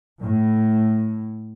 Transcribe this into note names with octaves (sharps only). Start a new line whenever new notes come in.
A2